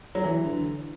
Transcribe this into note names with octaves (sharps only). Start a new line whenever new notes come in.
F#3
E3
D3